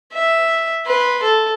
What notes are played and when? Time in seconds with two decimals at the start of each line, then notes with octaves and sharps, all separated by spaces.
0.13 E5
0.86 B4 C6
1.22 A4